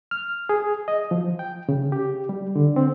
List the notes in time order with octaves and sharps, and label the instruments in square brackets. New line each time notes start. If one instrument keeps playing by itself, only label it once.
[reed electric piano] F6
G#4
D#5
F3
G5
C#3
G4
G3
D3
C4